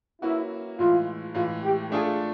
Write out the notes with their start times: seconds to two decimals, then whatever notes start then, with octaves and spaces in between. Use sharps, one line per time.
0.22 F#3 A#3 C#4 E4 F#4 B4
0.79 A2 E3 G#3 F4
1.34 A2 E3 G#3 F4
1.63 G4
1.91 A3 D4 F4 G#4 A4